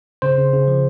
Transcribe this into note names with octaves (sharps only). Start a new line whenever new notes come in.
C#3 C5
C#3
C#3
F3